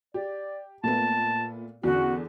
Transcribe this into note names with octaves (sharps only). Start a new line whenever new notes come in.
G4 D5
A#2 A3 B3 A5
E2 D3 C#4 F#4